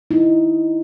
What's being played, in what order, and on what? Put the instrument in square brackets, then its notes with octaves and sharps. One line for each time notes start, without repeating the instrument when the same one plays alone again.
[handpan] D#4 E4